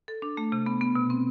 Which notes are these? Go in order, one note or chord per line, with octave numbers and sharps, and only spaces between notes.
A4
D4
A3
C3
B3
B3
B2
C4